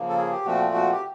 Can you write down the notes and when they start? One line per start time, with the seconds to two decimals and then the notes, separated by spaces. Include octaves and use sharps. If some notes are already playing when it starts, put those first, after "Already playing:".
Already playing: C#3 F3 A#3
0.09 A4
0.17 G#4
0.31 G4
0.45 A#2 F3 A3 C4 F#4
0.74 F#4
0.92 G4